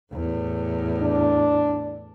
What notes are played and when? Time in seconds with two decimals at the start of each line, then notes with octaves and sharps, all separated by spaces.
0.13 E2 A2
1.02 D4